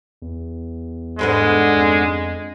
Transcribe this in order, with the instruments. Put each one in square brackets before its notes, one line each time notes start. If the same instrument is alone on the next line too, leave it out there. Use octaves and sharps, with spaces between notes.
[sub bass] E2
[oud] G#2 D3 B3 [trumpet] G#3
[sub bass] F2